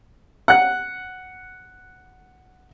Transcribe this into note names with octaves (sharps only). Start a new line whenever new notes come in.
F#5 F#6